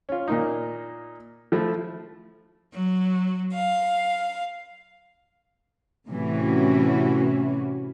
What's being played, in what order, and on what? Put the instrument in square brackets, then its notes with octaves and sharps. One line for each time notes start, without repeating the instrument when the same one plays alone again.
[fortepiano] C#4 F4
A#2 A#3 D#4
F3 A3 E4
[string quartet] F#3
F5
[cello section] A2 C3 E3 C#4 F#4